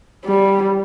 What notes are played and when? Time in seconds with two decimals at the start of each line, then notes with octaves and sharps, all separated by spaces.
0.25 G3